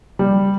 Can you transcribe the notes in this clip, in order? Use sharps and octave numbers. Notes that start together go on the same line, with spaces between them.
G3